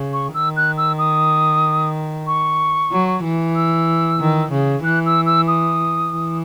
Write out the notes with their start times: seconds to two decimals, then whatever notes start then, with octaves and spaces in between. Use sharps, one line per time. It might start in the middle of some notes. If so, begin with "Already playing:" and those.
Already playing: C#3
0.13 C#6
0.34 D#3 E6
0.57 F#6
0.77 E6
0.98 D#6
2.27 C#6
2.92 F#3
3.23 E3
3.55 E6
4.20 D#3
4.52 C#3
4.84 E3 F#6
5.06 E6
5.26 E6
5.48 D#6
6.13 E3